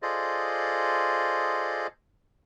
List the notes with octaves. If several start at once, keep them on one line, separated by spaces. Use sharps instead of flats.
F4 G#4 A4 C5 D5 D#5